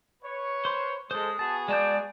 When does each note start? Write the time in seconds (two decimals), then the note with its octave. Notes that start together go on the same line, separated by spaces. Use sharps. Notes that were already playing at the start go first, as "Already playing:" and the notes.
0.23 B4 C#5
0.65 C5 C6
1.11 G#3 A4 C5 D#6
1.39 B3 F#4 G#4 A5
1.68 G#3 D5 A5 G6